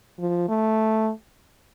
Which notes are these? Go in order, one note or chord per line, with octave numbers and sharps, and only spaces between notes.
F3
A3